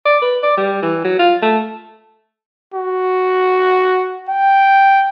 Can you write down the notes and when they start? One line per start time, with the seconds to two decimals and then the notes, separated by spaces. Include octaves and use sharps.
0.05 D5
0.22 B4
0.43 D5
0.58 G3
0.82 E3
1.04 F#3
1.19 F4
1.42 A3
2.74 F#4
4.29 G5